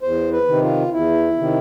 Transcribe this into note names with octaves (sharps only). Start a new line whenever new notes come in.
E2 C5
B4
C3 D#3
F4
E2 E4
C3 D#3